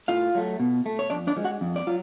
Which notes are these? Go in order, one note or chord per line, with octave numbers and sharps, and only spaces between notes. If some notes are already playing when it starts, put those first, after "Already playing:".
A2 F4 F5
F#3 A3
B2
A3
C#5
F2 D4 D5
D4 D5
F3 G#3
F#4 F#5
F2
D5
F#3 F4